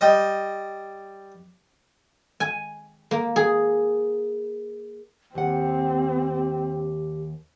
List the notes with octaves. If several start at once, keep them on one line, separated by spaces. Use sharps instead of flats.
G3 D#5
G#5
A#3
G#4
D#2 C4 G4 F#5